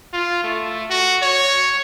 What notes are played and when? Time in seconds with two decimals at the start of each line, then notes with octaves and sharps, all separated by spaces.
0.13 F4
0.44 A3
0.90 F#4
1.22 C#5